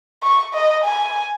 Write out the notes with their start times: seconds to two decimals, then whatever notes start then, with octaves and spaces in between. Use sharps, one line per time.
0.23 C#6
0.54 D#5
0.84 G#5